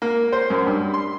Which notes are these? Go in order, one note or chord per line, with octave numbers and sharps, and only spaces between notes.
A#3
C5
F#2
G2
C6